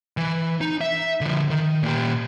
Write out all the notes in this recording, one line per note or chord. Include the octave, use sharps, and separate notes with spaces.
E3
D#4
E5
D3 F3
D#3
A#2 G4